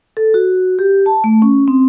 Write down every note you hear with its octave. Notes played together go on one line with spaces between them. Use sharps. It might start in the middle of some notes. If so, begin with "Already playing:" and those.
A4
F#4
G4
A5
A3
C#4
C4